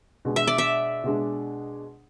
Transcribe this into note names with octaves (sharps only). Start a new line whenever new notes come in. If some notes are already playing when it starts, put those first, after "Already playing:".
B2 G#3 D4 G#4
E5
D5
E5
B2 G#3 D4 G#4